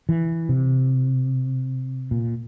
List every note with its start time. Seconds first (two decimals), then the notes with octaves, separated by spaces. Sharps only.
0.09 E3
0.49 C3
2.11 A#2